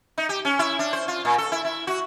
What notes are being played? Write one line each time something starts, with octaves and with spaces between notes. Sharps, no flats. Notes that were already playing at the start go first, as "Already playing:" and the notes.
D#4
G4
C#4
E4
D4
C5
F4
A#2
A4
E4
E4
F#4